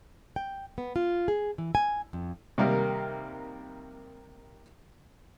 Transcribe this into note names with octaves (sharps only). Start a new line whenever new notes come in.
G5
B3
F4
G#4
E3
G#5
F2
C3 D#3 G3 A#3 D#4 A#4